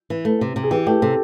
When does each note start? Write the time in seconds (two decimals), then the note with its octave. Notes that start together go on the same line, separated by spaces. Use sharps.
0.10 E3
0.25 A3
0.41 C3
0.56 C3
0.63 G#4
0.71 E3 G4
0.87 A3 G4
1.02 C3 A4